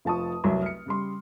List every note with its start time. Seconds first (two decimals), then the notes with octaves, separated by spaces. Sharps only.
0.05 F1 F3 A5 C#6 D#6
0.44 F1 C2 F#3 E5
0.62 F6 C#7
0.86 C#3 G3 C6